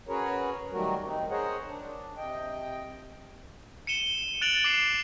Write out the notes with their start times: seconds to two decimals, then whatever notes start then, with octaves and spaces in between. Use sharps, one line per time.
0.08 C#4 F#4 G#4 A#4 B4 C#5
0.72 D#3 F#3 G3 A3 F#4 A#4
1.03 D#3 C4 D#4
1.30 G#4 A#4 C5 C#5 D#5 F#5
1.68 D4
2.18 C3 D#5 G5
3.87 C#7 D#7 E7 G7
4.41 F#6 A6 D7 F7 F#7
4.64 D6 C7